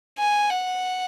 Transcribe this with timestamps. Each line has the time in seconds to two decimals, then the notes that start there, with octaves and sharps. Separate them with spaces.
0.19 G#5
0.50 F#5